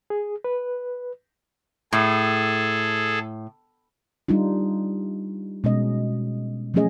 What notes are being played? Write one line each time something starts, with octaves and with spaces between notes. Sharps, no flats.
G#4
B4
A2 G#4 A4
G3 D4 D#4 F4
B2 G#3 C#4 D#5
F3 F#3 A3 C#4 G#4 D#5